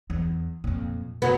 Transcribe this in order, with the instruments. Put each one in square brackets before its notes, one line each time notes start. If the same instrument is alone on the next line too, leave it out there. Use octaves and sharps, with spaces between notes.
[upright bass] E2
F2 A#2
[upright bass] F#1 [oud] F#3 B3